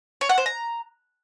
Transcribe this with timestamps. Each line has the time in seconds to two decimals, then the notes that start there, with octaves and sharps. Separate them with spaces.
0.21 C#5
0.29 F#5
0.38 C5
0.46 A#5